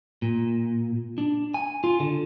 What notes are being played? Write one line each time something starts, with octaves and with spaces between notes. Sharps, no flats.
A#2
D4
G#5
F4
D3